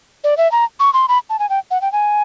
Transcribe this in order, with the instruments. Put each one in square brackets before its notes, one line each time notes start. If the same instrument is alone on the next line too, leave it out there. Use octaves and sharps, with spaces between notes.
[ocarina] D5
E5
A#5
C#6
C6
B5
A5
G#5
G5
F#5
G5
G#5